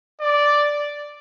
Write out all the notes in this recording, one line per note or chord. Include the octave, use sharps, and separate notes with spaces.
D5